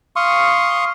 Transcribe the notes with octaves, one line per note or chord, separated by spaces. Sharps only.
F5 C6 C#6 D#6